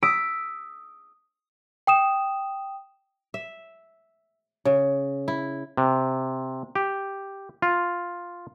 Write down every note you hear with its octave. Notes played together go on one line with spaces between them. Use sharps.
D#6 E6 B6 D7
G5 D#6 E7
E5
C#3
E4
C3
G4
F4